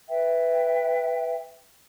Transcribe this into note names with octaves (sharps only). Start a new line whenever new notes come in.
B4 E5 G5